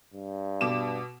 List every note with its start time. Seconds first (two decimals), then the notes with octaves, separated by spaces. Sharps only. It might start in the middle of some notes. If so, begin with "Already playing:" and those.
0.14 G2
0.61 B2 D6 E7